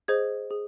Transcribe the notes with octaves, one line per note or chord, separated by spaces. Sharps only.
G#4 C5 D#5 G#6
G#4